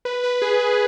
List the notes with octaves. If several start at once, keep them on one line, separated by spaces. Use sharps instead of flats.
B4
B4
G#4
B4